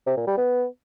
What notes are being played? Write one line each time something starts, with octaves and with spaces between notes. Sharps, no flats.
C3
A#2
G3
B3